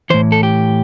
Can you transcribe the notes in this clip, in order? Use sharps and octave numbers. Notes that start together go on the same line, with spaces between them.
A2 E3 C5
A4
G4